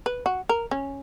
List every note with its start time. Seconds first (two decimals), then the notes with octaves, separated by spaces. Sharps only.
0.06 B4
0.26 F#4
0.49 A#4
0.71 C#4